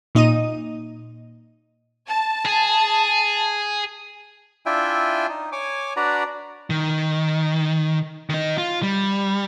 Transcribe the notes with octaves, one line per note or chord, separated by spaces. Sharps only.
A#2 D#4 D#5 D#7
A5
G#4
D4 E4 F4 E5 G5 G#5
D#4
C#5 G#5 D6
D4 F#4 B4 D5 A#5
D#3
D#3 D#4
F4
G3